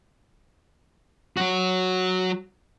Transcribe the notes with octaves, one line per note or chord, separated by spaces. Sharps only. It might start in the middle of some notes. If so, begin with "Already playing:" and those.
F#3 F#4